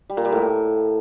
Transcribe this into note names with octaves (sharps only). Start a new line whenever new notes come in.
G3
A#2
G3
A2